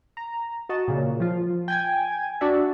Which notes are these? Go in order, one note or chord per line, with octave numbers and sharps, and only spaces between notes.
A#5
F#4 D#5 A5
A#2 C#3
F3 F4
G5 G#5 G#6
D4 F#4 D5 E5